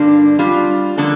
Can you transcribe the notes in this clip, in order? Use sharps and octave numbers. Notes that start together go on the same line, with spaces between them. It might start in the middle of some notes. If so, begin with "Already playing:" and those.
Already playing: G2 D3 G3 A#3 D4
G3 D4 F4
D3 F3 A#3 D4 A4